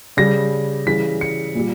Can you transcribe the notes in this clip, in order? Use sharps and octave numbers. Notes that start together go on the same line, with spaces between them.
C#3 G3 A#6
C#3 E3 G3 B6
C#7
A#2 G3